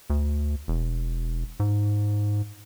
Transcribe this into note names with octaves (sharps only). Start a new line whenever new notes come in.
D2
E1
G#2